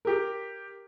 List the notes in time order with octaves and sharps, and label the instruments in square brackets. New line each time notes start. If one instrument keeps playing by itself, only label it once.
[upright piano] G4 A#4